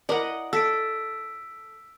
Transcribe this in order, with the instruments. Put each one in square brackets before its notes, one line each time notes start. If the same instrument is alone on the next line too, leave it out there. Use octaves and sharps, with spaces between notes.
[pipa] E4 A#4 D5 [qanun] D#5 F#5
[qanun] A4 [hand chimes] E6 B6 D7